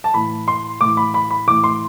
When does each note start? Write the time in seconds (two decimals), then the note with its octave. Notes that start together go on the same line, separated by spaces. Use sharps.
0.04 A5
0.14 A2 E3 B5
0.48 C6
0.80 A2 E3 D6
0.97 B5
1.14 B5
1.30 B5
1.47 A2 E3 D6
1.64 C6